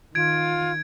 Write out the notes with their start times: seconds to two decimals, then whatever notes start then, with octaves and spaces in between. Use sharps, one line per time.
0.15 D#3 F4 G#6 D7